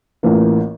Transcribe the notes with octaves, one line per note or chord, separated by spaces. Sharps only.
A1 A2 E3 A#3 F4